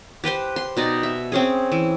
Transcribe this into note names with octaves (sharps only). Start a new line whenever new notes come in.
G4 B4 C5 C6
C6
B2 D#4 D5
E5
C4 C#4 G#4
E3